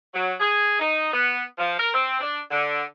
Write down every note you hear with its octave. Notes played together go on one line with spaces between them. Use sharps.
F#3
G#4
D#4
B3
F3
A#4
C4
D4
D3